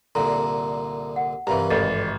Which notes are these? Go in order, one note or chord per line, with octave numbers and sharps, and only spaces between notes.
C2 A#2 D3 A4 A#5
F#5
G2 C3 E3 G4 A#4 F5 A#5
G#1 A4 B4 D#5 A6